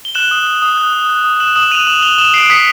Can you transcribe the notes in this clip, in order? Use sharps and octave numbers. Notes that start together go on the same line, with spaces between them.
G7
F#6 E7 F#7
D#6
F#6
D#6
F#6
D#6
F#6
D#6
F#6 E7 F#7
D#6 E7 F#7
F#6 D#7 F7
D#6 E7 F#7
F#6 F7 G7
D#6 E7 F#7
F#6 C7 D7
D#6 B6 C#7